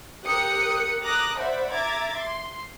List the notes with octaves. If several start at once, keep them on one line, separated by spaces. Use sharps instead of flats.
G4 A#4 D#6 F#6 C#7
A#5 D6 D#6 F#6 A#6
C5 D5 E5 F#5 B5
E5 A#5 D6 G#6 A6
C6